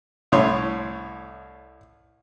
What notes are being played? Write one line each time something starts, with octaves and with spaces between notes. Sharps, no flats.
C2 A2 C#5 C6